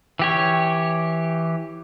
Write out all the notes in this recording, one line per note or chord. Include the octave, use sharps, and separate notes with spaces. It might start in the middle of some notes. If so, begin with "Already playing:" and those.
E3 G4 C#5